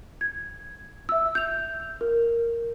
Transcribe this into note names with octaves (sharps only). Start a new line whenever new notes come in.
G#6
E5 E6
G6 F7
A#4